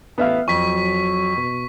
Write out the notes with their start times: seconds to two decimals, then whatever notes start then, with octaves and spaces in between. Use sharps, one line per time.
0.18 A1 B3 E5 F5
0.48 F2 F#3 C#6 B6
1.37 B2